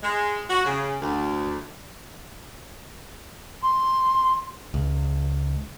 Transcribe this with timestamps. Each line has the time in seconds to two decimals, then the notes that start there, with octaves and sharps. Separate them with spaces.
0.03 G#3
0.50 F#4
0.65 C#3
1.01 D2
3.62 C6
4.74 C#2